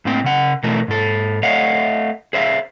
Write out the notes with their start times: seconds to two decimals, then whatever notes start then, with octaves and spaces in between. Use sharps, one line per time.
0.05 A2 A#3 C4 G5
0.24 C#3 F#5
0.63 B2 E3 A3 A#4
0.88 G#2 A4
1.43 A3 C#5 D#5 F5 F#5
2.33 G#4 C5 E5 F5